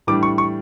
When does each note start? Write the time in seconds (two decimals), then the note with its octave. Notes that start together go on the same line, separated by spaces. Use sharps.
0.07 A2 E3 G3 D4 D6
0.23 C#6
0.38 C#6